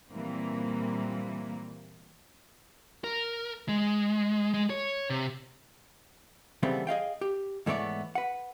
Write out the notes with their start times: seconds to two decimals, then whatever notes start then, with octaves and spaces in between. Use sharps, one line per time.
0.11 A#2 E3 G3 A#3 C4
3.04 A#4
3.69 G#3
4.54 G#3
4.70 C#5
5.10 C3
6.63 C#3 E3 G3 A3 B3 C4
6.87 G#4 D#5 F5 G5
7.21 G4
7.66 G#2 E3 A3 B3 C#5 D5
8.15 B4 F#5